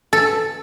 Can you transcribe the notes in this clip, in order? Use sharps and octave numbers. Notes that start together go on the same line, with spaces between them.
A4